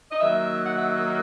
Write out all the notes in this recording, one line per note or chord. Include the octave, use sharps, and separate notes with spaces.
D#5
D#3 F#3 A#3 E5
F#5
E5